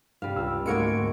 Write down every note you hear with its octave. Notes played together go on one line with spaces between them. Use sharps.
G2 C3 G3 F5
C#2 E6
D2 G#2 G#3 A#3 F#4 G#6 C#7 D7